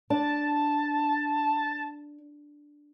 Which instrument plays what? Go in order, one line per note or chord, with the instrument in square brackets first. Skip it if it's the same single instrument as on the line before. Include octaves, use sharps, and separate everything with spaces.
[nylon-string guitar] D4 [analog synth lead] A5